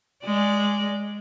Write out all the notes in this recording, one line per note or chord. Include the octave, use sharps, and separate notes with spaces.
G#3 D5